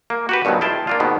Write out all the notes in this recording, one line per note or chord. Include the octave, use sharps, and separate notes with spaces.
A#3
F#4 G4 B4
G2 B2 D#3 F3 F#3
E4 F4 G#4 G5 A5
A#3 D4 F4
G#2 B2 D#3 B3